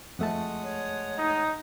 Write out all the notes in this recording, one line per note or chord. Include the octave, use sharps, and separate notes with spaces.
F2 G#3 A3 F#5 A5 D#6
C#5
D#4